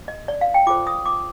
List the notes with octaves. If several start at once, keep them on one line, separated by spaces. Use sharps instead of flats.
D#5
D5
F5
G5
F4 A4 C5 D6
D#6
D6